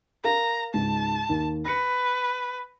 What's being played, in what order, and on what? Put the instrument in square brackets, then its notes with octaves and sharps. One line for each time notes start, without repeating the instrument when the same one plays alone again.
[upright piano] A#4 F5 [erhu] A#5
[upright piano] C#2 G#2 [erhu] A5
[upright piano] D#2
[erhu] B4 [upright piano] A#6 C#7